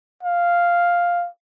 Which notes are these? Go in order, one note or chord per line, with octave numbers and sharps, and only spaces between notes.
F5